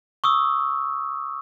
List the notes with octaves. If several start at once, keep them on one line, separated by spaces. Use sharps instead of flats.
C#6 D#6 E6